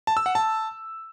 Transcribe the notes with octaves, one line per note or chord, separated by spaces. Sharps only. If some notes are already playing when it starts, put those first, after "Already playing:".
A5
E6
F#5
A5